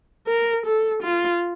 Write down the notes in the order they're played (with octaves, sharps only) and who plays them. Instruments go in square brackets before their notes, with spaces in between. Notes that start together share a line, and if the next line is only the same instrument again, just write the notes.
[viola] A#4
A4
F4